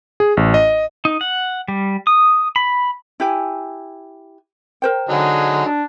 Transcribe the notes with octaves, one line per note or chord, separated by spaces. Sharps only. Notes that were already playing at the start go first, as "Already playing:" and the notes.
G#4
A1
D#5
D#4
F#5
G3
D#6
B5
E4 G4 G#5
A#4 C5 G5
D3 F#3 D#4 G#4
D4